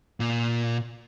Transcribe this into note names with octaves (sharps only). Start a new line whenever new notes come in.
A#2